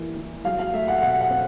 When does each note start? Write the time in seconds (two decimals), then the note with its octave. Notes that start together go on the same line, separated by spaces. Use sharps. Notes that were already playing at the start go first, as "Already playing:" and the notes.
Already playing: E3 G3 A#3
0.16 E3
0.45 F#3 F5
0.59 F5
0.74 A3 E5
0.88 F#5
1.01 B2 F#5
1.21 F#5
1.30 C4